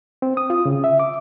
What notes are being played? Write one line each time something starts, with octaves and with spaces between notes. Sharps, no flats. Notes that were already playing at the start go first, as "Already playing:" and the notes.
C4
D#6
F4
C#3
E5
D6